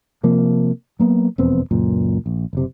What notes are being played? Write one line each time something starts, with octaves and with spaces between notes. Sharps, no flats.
C3 F3 A#3
F#3 A#3 B3
E1 F2 B3 C4
C#2 F#2 A#2
A#1
F#1 C3